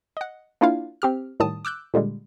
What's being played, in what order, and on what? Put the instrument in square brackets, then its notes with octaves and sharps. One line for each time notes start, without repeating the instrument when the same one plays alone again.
[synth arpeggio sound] D#5 F#5
A#3 D4 E4 F4 F5
C4 G4 F6
A2 D#3 G3 A5 D#6
D6 E6 F#6 G6
A#2 D3 G3 G#3